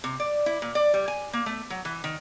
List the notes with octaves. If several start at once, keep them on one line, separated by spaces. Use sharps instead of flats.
C3
D5
E4
A#2
D5
G3
G#5
A#3
A3
F#3
E3
D#3